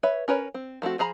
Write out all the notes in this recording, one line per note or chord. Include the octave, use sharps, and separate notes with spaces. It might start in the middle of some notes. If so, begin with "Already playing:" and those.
B4 C#5 E5
C#4 A#4 B4 C#5
C4
F3 A3 C4 F#4
F3 G#4 A#5 B5